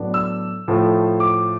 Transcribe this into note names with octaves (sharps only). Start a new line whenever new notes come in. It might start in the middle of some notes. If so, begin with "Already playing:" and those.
Already playing: A2 F#3 B3 D4
E6
A2 F3 A3
D6